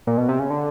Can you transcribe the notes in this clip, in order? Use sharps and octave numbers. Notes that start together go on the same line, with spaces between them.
A#2
B2
C3
C#3
D3